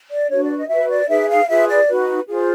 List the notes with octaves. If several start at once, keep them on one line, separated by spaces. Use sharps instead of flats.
D5
D4 F#4 B4 C#5
D5
D#5
F#4 B4 E5
D5
D#4 G#4 B4 E5
F5
F4 G#4 B4 E5
D5
D#4 F#4 B4
F4 G#4 C5